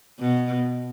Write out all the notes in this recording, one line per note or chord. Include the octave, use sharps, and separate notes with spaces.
B2